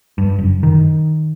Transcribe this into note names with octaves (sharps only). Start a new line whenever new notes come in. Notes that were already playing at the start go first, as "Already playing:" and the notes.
G2
F#1
D#3